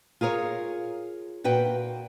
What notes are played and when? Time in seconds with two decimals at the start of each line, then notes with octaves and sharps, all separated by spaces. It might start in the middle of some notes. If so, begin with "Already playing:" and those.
0.21 F4 G#4 A#4 C#5
1.44 A#2 F#4 B4 G5